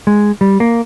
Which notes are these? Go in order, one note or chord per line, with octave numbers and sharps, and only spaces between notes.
G#3
G3
A#3